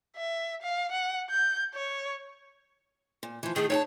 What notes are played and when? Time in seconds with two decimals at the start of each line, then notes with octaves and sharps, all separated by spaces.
0.16 E5
0.62 F5
0.92 F#5
1.30 G6
1.74 C#5
3.23 A#2
3.43 E3 F3
3.56 D#3 A3 D#4 G#4
3.70 D#4 C#5 G5 A5